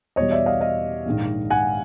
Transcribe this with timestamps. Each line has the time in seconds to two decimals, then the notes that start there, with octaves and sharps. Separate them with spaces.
0.16 E2 B2 G3 C#5 D#5
0.32 D5 E5
0.46 D#5 F5
0.61 D#5 F5
1.06 A#1 G#2 D#3
1.50 F#5 G#5